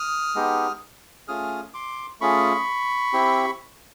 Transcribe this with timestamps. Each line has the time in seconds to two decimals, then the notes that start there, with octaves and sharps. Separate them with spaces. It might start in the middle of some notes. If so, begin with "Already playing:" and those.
Already playing: D#6 F6
0.35 G#3 B3 D#4 G4
1.28 A3 C#4 F4 G#4 D#6 F6
1.74 C6 D6
2.20 A3 C#4 F4 G#4 B5 C#6
3.13 C4 E4 G4